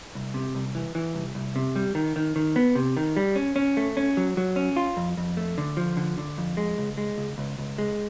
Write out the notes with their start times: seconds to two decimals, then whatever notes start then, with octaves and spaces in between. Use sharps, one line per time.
0.15 C2
0.34 C3
0.55 C2
0.75 E3
0.95 E3
1.15 C2
1.35 C2
1.56 C3
1.76 G3
1.95 D#3
2.16 D#3
2.36 D#3
2.56 B3
2.75 C3
2.97 D#3
3.17 G3
3.36 C#4
3.56 C#4
3.77 A3
3.97 C#4
4.17 F#3
4.37 F#3
4.56 C#4
4.76 F4
4.97 F2
5.17 F2
5.37 A3
5.58 D3
5.77 F3
5.97 D3
6.18 D3
6.38 F2
6.57 G#3
6.78 C#2
6.98 G#3
7.18 C#2
7.38 C#2
7.58 C#2
7.78 G#3